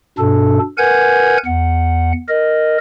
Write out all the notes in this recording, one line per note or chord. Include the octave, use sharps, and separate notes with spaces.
G2 B2 D4 A4
A#4 B4 F#5 G#5 G6 G#6
E2 F#5
A#4 D#5